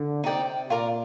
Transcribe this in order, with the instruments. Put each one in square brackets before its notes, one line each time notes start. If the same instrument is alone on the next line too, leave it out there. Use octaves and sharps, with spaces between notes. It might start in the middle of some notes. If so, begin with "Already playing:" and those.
Already playing: [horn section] D3
[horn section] C3 [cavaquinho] D#4 G4 D5 G5
[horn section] A#2 [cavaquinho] F4 A#4 D5